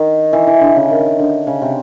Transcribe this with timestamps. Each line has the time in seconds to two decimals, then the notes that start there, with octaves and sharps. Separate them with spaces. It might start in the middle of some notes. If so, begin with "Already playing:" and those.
Already playing: D#3
0.33 E3
0.47 E3
0.61 D3
0.76 C#3
0.90 D#3
1.19 D3
1.47 C#3
1.62 C3